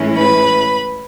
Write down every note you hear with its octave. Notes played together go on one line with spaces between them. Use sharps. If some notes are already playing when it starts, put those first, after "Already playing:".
Already playing: A2 E3 G#3 C#4 E4
B4 B5